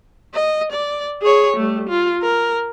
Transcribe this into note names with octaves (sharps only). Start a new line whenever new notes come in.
D#5
D5
G#4 C#5
G3 A3
F4
A#4